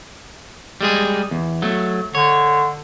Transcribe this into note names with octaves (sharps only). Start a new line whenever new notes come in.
G3 G#3 G#4
E2
F#3 A3
D3 C#5